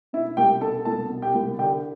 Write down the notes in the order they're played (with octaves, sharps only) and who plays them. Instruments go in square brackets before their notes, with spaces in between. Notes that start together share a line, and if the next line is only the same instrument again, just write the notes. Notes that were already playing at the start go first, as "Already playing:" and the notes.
[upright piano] B2 E4 E5
C2 G4 G5
B2 A4 A5
C2 A4 A5
B2
G4 G5
C2
D3 G4 G5